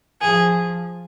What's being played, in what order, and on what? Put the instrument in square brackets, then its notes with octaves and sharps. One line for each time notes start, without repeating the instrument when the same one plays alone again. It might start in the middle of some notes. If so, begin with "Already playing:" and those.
[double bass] F3 [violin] G#4